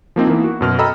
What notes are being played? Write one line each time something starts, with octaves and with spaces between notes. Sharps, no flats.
F3 A#3 C4 D#4
E3 A#3 B3
F#4
F#2 B2 F6
A4 D#5 G5 A#5 B5 E6